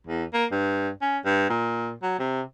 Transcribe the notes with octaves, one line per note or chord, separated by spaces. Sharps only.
E2
A#3
G2
C#4
G2
A#2
F#3
C3